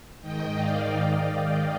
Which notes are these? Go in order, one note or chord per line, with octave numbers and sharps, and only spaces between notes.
G#2 D#3 D#5 G5
D5 F5